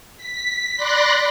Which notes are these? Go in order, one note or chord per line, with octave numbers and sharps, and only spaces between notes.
B6
D5 B5 C6 F#6 A#6